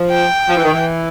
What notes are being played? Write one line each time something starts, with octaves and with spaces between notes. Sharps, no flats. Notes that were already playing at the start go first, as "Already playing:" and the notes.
Already playing: F3
G5
F3
E3
D#3
E3